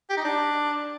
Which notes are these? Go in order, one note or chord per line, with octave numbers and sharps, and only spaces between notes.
G4
D#4
D4